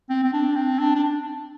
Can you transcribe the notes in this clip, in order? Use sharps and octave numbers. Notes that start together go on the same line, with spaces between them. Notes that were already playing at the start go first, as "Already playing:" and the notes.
C4
C4
D4
C4
D4
D4